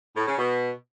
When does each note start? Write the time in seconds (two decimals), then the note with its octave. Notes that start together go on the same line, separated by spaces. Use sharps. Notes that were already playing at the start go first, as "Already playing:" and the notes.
0.17 A2
0.27 C#3
0.38 B2